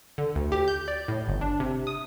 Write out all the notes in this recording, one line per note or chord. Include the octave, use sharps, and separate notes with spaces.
D3
D2
G4
G6
D5
A2
G1
D4
C3
D#6